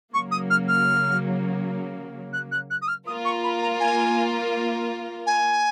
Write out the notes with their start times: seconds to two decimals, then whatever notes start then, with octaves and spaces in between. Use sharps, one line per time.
0.13 C#3 F#3 A#3 C#6
0.31 D#6
0.50 F6
0.68 F6
2.33 F#6
2.52 F#6
2.70 F#6
2.82 D#6
2.88 F6
3.07 A#3 F4 A#4 D#6
3.25 C#6
3.43 B5
3.62 A#5
3.80 G#5
5.26 G#5